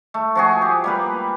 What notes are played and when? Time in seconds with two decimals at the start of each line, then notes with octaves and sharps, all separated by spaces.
0.14 A3
0.35 F3 F#4 G#4
0.62 G4
0.84 G3 A#3 B4